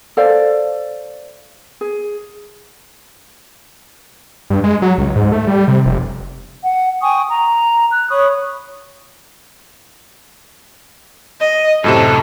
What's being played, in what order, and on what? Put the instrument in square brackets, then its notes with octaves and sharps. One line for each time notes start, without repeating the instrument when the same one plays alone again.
[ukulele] A4 C5 D5 F5
G#4
[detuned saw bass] G2
G#3
F#3
C#2
G#2
A3
G3
C3
F1
[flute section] F#5
G5 G#5 C#6 D#6
A#5
F#6
C#5 B5 C#6 D#6
[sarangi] D#5
[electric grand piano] F#2 A2 C3 [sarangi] A4